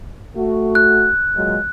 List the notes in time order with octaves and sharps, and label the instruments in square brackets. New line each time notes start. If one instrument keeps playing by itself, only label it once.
[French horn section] A3 F#4
[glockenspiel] F#6
[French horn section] A#2 F#3 G#3